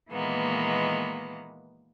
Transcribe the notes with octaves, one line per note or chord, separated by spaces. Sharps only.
A#2 D#3 E3 G#3 A#3 B3